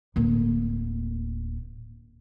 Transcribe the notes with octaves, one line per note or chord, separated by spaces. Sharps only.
D1 A#3